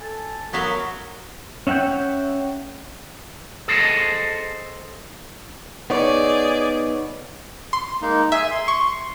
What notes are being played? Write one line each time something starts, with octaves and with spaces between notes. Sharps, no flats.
A4 G#5 A5
F#3 B3 F#4 A#4 E5 F5
C#4 E5 F#5 G5 G6
G#4 A4 C5 C#5 D#5 A5
B3 D#4 G#4 C#5 D5
C6
G#3 A#3 D#4
G#4 E5 G#5
C6
C#6